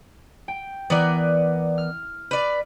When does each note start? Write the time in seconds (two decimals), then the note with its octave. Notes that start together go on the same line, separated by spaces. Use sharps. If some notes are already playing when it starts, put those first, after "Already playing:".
0.48 G5
0.90 E3 B3 A#4 D5
1.78 F6
2.31 B4 D5